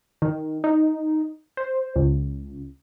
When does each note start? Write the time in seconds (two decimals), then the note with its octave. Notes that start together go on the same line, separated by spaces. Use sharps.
0.22 D#3
0.64 D#4
1.57 C5
1.96 C#2